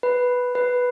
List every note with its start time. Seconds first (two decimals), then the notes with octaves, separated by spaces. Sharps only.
0.03 B4
0.55 B4